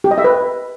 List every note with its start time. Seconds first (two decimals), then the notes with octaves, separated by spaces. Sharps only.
0.04 G4
0.11 D#5
0.18 E5
0.24 B4